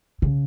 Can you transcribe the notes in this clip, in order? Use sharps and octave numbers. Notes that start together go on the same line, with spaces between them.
C#3